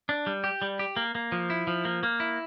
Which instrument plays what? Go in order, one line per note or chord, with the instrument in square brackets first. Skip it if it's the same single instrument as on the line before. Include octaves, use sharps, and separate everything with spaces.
[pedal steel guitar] D4
G3
G4
G3
G4
A#3
A#3
F3
E4
F3
A#3
A#3
E4